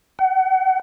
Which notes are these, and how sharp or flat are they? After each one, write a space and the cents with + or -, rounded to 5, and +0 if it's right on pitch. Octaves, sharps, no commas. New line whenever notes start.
F#5 +35